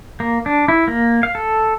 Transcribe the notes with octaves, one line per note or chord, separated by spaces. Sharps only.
A#3
D4
E4
A#3
F5
A4